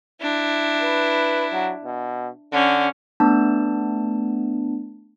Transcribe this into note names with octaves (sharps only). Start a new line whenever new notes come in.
D4 E4
B4
F#3
B2
D3 C#4
A3 B3 D4 A5